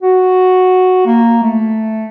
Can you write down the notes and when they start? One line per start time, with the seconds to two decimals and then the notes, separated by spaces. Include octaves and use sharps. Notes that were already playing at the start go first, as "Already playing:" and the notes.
0.03 F#4
1.06 A#3
1.43 A3